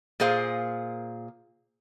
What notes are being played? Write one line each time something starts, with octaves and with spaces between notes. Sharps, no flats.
A#2 A#3 G#4 C5 F5